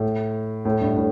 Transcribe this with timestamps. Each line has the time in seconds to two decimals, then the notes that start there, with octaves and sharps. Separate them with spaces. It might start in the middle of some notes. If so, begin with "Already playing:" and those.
Already playing: A2
0.65 A2
0.81 G2
0.97 A2